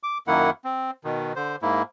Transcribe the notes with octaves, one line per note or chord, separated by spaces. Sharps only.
D6
F#2 D#3 A#3 E4 F#5
C4
B2 D#3
D3 C5
G#2 A#3 E4